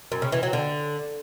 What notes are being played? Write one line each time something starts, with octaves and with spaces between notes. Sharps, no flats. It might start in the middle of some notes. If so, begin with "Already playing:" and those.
F#2
C#3
E3
F#3
D3